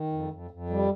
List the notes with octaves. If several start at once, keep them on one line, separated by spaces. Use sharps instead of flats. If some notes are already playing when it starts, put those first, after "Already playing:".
Already playing: D#3
F2
F2
F2
G3